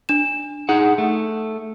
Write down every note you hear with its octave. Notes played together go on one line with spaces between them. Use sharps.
D4 E7
D#4 G#4 F#5
A3